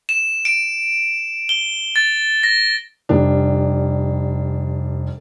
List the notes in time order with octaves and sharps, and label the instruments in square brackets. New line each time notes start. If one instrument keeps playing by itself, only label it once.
[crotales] E7
D7
G7
A6
A#6
[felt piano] F1 G3 D4